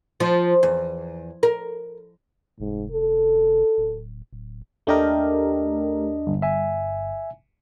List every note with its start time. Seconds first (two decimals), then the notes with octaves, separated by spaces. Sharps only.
0.20 F3
0.63 E2
1.43 A#4
2.60 F1 G#2
2.92 A4
3.78 D1
4.33 D1
4.87 D#2 A3 D4 G4 A#4 D#5
6.27 G1
6.42 E5 G#5